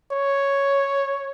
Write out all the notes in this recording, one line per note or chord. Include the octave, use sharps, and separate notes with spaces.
C#5